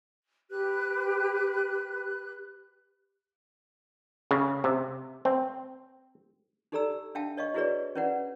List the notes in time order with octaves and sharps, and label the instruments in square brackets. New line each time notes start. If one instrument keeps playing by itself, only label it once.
[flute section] G4 B4 F#6
[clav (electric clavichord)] C#3
C3
C4
[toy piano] D#4 G4 A4 D5 A#5 E6
D4 E5 F5 G5 A5
C#5 D#5 F5 C#6
E4 F#4 G#4 B4 C#5 D5
C#4 E4 B4 D5 F#5